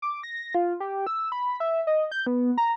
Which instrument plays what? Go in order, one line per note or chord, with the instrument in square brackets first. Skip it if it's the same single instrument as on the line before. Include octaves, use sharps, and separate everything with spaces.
[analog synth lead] D6
A#6
F4
G4
E6
B5
E5
D#5
G6
B3
A#5